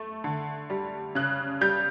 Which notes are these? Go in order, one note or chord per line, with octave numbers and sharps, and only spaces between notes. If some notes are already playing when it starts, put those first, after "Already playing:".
Already playing: A3
D3
G3
C#3 F#6
G3 G6